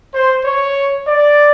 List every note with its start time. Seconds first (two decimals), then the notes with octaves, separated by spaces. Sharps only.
0.14 C5
0.45 C#5
1.07 D5